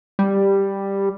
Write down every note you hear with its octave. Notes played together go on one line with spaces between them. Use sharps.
G3